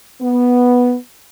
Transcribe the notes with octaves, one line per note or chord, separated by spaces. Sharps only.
B3